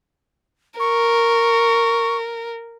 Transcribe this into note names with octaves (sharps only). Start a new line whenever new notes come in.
A#4 C#6